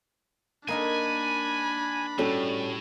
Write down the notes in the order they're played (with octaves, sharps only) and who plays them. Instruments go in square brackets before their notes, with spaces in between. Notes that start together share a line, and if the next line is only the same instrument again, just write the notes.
[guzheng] A#3 D#4 A#4 [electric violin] D4 B5 [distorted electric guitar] G#5
[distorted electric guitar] A2 [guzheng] G3 [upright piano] C#4 F#4 A4